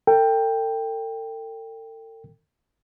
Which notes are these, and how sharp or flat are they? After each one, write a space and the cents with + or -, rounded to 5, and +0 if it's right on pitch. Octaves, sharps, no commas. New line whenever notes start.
A4 +45 G5 +10